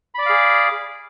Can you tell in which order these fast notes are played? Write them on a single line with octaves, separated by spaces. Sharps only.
B5 D5 D6 F5 G#4